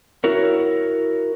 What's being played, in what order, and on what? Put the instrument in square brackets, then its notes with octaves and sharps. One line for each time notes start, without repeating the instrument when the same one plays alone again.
[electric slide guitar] E4 F#4 A#4 C#5